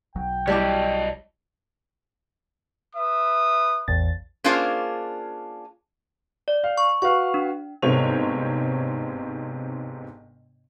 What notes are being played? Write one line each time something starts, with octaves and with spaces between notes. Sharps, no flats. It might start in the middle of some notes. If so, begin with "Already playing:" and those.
B1 F#3 G5
G3 E4 G4 C#5 D#5 A5
B4 E5 D#6
A1 E2 A6
A#3 C#4 D4 F4 G#4 C5
D5
F5
C#6
F#4 B4 F5 C#6
D4
G1 G#2 C3 C5 C#5 F7